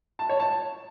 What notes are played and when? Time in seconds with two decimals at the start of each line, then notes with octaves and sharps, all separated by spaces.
0.19 A5
0.29 C#5
0.40 A5